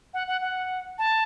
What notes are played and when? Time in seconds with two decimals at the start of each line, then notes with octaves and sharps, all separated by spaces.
0.14 F#5
0.28 F#5
0.42 F#5
0.98 A5